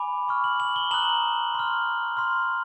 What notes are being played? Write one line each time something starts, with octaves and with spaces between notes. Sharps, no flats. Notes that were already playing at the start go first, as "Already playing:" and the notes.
Already playing: G#5 B5 D6
C#6 F6
F#7
F#7
G7
A#5 D#6 F#6 F#7
C6 F6
C6 F6